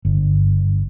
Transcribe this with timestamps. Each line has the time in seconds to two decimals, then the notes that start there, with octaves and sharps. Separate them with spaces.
0.05 G1